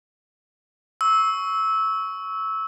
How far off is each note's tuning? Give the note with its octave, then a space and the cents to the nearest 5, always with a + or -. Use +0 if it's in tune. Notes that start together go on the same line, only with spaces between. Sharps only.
C#6 +10 E6 -15